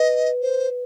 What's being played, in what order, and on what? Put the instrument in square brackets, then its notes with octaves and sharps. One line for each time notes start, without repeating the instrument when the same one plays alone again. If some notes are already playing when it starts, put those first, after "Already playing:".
Already playing: [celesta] B4 [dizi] D#5
[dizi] C5